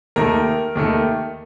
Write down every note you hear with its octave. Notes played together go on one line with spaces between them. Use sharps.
D#2 D#3 A3 A#4
D#2 D#3 A3